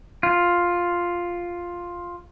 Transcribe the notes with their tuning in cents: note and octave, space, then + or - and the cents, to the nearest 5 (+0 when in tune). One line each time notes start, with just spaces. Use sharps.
F4 +5